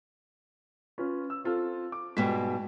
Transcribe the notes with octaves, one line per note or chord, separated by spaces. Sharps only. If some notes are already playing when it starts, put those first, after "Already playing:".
C#4 F4 B4
E6
C4 F4 A4
D6
G#2 B2 G3 B6